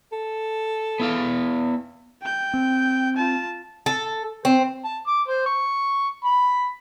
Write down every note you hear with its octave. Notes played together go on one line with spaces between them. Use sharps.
A4
B3 E4 F5
G5 G6
C4
F4 A5
A4
C4
A5
D6
C5
C#6
B5